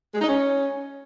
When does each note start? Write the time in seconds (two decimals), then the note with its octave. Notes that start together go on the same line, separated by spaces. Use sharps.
0.14 G#3
0.21 D#4
0.28 C#4